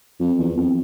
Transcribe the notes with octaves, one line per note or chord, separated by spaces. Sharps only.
F2
E2
F2